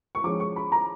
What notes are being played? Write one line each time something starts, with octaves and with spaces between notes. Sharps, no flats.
C#6
F3 G#3 C#4 D6
C#6
B5
A#5